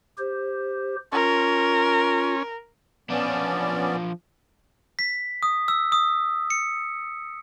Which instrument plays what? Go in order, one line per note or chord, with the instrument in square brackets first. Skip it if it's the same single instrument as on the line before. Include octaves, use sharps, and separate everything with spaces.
[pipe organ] G4 C5
[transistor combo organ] C#4 [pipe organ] F4 [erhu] A#4
[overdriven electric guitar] F3 D4 [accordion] B3 C#4 D5
[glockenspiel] B6
D#6
E6
D#6
C#7